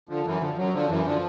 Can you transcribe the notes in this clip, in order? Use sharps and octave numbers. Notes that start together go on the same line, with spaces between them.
D3 F3
F#2 E3
D3 F3
F#2 F#3
D3 F3
F#2 E3
D3 F3